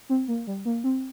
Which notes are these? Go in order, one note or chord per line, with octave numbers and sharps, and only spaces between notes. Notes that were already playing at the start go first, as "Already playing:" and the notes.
C4
A#3
G3
A#3
C4